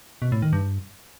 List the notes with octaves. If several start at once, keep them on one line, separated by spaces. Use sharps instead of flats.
B2
A2
D#3
G2